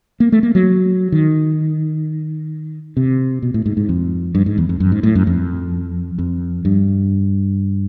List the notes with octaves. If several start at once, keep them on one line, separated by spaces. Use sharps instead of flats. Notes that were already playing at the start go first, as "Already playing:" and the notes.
A#3
A3
A#3
F#3
D#3
C3
B2
A2
G#2
G#2
F2
G2
G#2
E2
F2
F#2
G#2
A2
F#2
F2
F2
G2